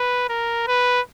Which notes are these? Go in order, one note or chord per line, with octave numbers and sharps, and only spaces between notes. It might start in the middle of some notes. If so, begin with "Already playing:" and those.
Already playing: B4
A#4
B4